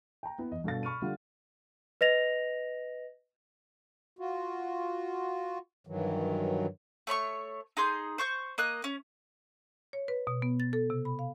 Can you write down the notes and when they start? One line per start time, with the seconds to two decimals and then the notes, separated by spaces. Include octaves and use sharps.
0.23 G5 A#5
0.39 B3 E4
0.51 E2 D#5
0.64 G2 B2 A4 F5 A6
0.83 B5 C#6 F6 D#7
1.02 D3 G3 F4 F#5 F6
2.01 B4 D#5 A#6 F7
4.19 F4 F#4
5.87 G2 D#3 E3 F#3
7.07 A3 C#5 B5 C#6
7.77 D#4 G#4 C6 G6
8.18 C5 C#6 G6
8.58 A#3 D#5 F#6
8.84 C#4
9.93 C#5
10.08 B4
10.27 B2
10.42 B3
10.60 A6
10.73 A4
10.90 C3
11.05 B5
11.19 F5